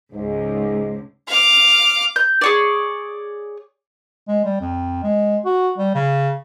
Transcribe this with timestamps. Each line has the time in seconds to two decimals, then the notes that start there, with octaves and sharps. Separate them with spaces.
0.14 C#2 G#2
1.28 F5 D6
2.16 G6
2.41 G#4 C#5 D5
4.28 G#3
4.45 G3
4.61 F2
5.04 G#3
5.45 F#4
5.78 G3
5.95 C#3